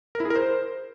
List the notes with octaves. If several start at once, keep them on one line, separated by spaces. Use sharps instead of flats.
A#4
E4
G#4
A#4
C5